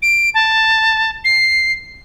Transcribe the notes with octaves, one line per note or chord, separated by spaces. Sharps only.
D7
A5
C7